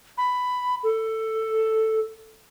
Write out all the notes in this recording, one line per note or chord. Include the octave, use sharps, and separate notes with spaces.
B5
A4